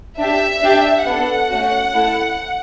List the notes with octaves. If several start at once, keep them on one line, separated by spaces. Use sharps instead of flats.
D4 G4 E5
D4 G4
B3 D4 A4 F#5
A3 C#4 F#4
A3 E4 A4